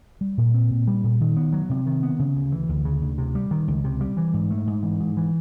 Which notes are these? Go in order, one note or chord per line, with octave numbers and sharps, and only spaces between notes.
G3
A#2
C4
A#2
G3
A#2
D#3
B3
F#3
C3
D#3
B3
C#3
D2
E3
D2
C#3
D2
C3
G3
D#3
C#2
C3
G3
E3
G#2
A3
G#2
E3
G#2
E3